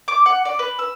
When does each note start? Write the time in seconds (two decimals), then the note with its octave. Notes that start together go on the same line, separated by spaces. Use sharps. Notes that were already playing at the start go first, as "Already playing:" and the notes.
0.08 D6
0.26 F#5
0.45 D5
0.59 B4
0.79 E6